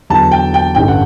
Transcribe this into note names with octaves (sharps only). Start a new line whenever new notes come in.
E2 D3 F#3 A5
G5
G5
A1 G2 D3 G5
F#5